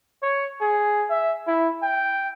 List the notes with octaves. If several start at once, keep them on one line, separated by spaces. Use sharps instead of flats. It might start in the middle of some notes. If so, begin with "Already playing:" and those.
C#5
G#4
E5
E4
G5